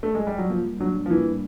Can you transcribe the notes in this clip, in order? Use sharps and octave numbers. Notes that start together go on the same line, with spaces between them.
A3
G#3
G3
F#3
F3 A#3
G3
F#3 D4
G3
F3
E3 A#3
G3